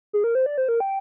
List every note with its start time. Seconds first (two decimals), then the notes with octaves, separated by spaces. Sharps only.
0.13 G#4
0.24 A#4
0.35 C5
0.46 D5
0.58 C5
0.69 A#4
0.80 G5